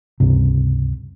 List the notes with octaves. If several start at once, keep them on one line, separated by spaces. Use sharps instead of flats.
C#2 G2 C3